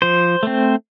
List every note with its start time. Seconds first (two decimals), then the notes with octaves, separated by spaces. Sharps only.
0.02 F3 C5
0.43 A3 C4